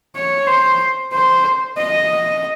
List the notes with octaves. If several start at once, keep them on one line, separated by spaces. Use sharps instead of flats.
C#5
C5
C5
D#5